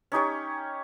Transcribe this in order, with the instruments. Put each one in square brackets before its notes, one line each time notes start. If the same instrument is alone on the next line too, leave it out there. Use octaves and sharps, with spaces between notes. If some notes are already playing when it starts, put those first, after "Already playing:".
[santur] C#4 D#4 G4 C#5